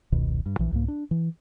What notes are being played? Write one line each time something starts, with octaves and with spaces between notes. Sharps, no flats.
F1 C#2 B2 D#3
G2
A#1 E3
C2 G#2 A#3
D4
E3